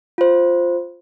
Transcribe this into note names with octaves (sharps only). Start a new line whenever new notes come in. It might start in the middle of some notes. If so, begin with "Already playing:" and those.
F4 C5